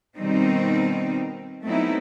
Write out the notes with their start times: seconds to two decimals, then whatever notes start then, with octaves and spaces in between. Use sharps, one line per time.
0.18 B2 D#3 G3 C4 D#4
1.64 F#3 A3 B3 C4 D#4 E4